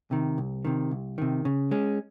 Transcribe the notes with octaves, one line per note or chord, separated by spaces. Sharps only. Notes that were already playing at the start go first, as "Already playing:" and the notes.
C3 D#3
C2
C3 D#3
C2
C3 D#3
C#3
G#3 C#4